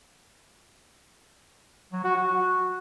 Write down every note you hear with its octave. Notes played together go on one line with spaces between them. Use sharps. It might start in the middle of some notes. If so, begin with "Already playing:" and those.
F#3
F#4
F#4
F#4